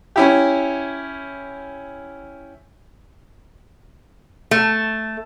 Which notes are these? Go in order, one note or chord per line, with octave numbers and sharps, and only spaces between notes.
C#4 E4 G4
A3